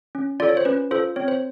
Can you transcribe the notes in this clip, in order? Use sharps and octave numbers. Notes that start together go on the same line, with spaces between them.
C#4
F4 A4 D5
C#5
C5
C#4 B4
F4 A4 C5
C4 C#5
C5